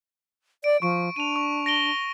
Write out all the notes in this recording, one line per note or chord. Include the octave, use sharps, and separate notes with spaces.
D5 D7
F3 C#6 D7
D4 D#7 F7
C#6
A#6 D7 G7